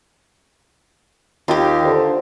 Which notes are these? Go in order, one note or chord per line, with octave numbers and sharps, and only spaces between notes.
D#2 F4 G4
D3 C5